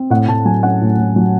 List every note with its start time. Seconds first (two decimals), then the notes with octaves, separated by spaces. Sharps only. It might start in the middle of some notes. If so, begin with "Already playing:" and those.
Already playing: C4
0.10 A2 F#5
0.28 A2 A5
0.45 F#3 G#5
0.63 C#4 F#5
0.81 A2
0.98 A2
1.16 F#3